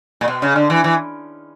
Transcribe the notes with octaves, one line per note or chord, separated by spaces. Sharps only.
A#2
B2
C#3
D3
E3
E3